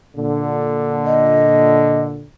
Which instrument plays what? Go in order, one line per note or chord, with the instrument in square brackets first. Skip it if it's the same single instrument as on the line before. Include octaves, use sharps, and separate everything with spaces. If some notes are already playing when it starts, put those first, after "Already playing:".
[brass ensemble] A#2 D3
[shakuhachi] D#5